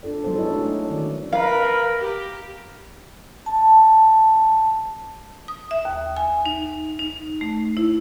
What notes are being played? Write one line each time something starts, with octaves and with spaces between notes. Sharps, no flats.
D4 F4 A4 D5
F#3 G#3 B3 A4 C5
D#4 E4 G#4 B4 C#5 D#5
A3 D4 F#4
C#5
D#3 C#4 D5
A#4 B4 F5
G4
A5
D#6
E5
D#2
G#5
D#4
D#4
A3
E4